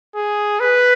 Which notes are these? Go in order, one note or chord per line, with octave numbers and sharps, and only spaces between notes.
G#4
B4